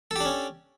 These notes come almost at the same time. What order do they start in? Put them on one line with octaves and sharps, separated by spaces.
A4 G4 D4 C#4